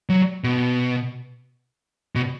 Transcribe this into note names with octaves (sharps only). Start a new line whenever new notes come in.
F#3
B2
B2